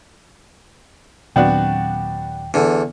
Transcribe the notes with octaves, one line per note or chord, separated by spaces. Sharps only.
D#2 A#2 F#3 B3 C4 D4 F#4 G5
E2 D3